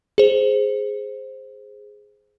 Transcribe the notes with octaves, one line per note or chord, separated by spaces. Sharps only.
G#4 C5